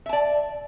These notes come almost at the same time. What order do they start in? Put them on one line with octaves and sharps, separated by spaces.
E5 A5 D5